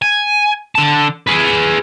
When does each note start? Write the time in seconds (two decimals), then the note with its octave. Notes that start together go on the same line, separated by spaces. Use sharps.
0.02 G#5
0.75 D3 A5
1.27 G#4 B4